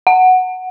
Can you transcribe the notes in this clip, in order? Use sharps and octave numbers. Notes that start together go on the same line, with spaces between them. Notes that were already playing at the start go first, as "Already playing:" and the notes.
F#5